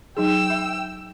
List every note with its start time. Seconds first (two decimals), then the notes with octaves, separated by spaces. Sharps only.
0.17 F#3 D#4 G#4 G5 E6
0.50 E5